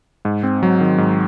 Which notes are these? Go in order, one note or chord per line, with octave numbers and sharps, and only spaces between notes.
G#2
C4
F#3
D#3
G#2